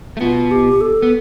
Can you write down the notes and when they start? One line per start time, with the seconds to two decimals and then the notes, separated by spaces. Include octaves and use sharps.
0.17 A3
0.21 B2 B3 F4
0.51 G4
0.81 A4
1.02 B3